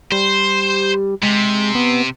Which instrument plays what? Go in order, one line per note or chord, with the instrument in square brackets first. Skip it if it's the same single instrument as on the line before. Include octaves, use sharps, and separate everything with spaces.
[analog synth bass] G3 [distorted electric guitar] C5
[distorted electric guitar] C3 [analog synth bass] G#3
[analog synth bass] B3